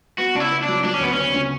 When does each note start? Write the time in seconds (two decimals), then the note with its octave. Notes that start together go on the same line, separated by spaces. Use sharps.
0.18 B3 F#4
0.35 C#3 D4
0.40 E4
0.51 B3
0.63 D4
0.68 F#3
0.84 F#3 D4
0.94 C#4
1.01 D2 B3
1.13 C#4
1.18 B3
1.34 C#3